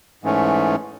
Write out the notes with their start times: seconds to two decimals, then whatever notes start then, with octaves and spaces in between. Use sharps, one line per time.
0.23 G#2 E3 A3 C#4